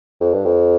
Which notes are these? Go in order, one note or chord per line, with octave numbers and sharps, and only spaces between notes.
F2
G2
F2